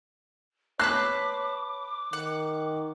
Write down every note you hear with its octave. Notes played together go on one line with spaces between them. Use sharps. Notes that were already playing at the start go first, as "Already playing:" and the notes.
B4 C#5 A5 C6 D6 F#6
D#3 F#5